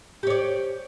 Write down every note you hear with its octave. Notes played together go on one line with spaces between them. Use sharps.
G4 C#5 D5